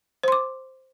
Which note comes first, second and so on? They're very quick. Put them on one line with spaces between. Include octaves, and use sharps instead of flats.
C5 C6 D6